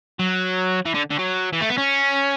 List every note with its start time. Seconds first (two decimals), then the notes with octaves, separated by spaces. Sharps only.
0.19 F#3
0.86 E3
0.95 D3
1.11 D3
1.19 F#3
1.53 E3
1.61 A3
1.69 B3
1.78 C#4